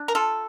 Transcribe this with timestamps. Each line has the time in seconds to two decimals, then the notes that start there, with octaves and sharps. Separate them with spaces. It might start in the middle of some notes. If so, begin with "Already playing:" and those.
Already playing: D4
0.08 A#4
0.15 F4 A4